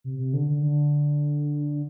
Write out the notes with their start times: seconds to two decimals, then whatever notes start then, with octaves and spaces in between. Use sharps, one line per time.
0.04 C3
0.19 C3
0.33 D3
0.49 D3
0.62 D3